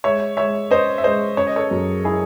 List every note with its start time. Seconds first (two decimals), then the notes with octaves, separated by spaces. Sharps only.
0.04 G#3 C#5 E5
0.37 G#3 C#5 E5
0.71 C#4 C5 D#5
0.98 E5
1.04 G#3 C5 D#5
1.37 C#4 C#5
1.47 D#5
1.56 A4 C#5
1.71 F#2
2.05 E4 G#4